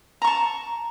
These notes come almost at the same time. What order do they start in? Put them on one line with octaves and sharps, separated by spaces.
A#5 C#6 A5